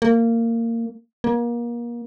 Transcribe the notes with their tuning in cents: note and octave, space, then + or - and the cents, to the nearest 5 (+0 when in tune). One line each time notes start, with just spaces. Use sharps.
A#3 -20
A#3 +30